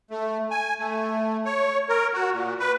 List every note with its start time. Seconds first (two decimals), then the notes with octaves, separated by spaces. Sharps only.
0.11 A3
0.51 G#5
0.79 A3
1.45 C#5
1.89 A#4
2.13 F#4
2.33 A#2
2.60 B4